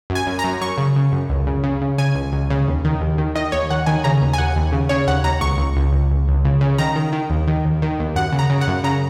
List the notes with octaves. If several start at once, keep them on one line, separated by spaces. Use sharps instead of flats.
F#2
G#5
F#2
A#5
F#2
F#2 C#6
C#3
C#3
F#2
C#2
C#3
C#3
C#3
C#3 G#5
C#2
C#2
C#3
D#2
D#3
D#2
D#3
D#3 D#5
D#2 C#5
D#2 F#5
D#3 G#5
C#3 A#5
D#2
G#5
D#2 F#5
D#2
C#3
C#3 C#5
D#2 F#5
D#2 A#5
C#2 C#6
C#2
C#2
C#2
C#2
C#2
C#3
C#3
D#3 A#5
D#3
D#3
D#2
D#3
D#2
D#3
D#2
F#2 F#5
C#3
A#5
C#3
F#5
F#2
C#3 A#5